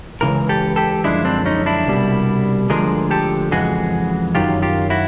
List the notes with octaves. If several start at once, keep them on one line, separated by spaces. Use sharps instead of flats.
C#2 C#3 E3 A#4
G4 A4
G4 A4
F#2 D3 F3 G#3 D4 E4
C4 D4
C#4 D#4
D4 E4
C2 B2 G3
D2 D3 F3 G#3 G#4 A#4
G4 A4
F2 C#3 E3 G#3 F#4 G#4
F#2 D#3 F#3 F4 G4
F4 G4
E4 F#4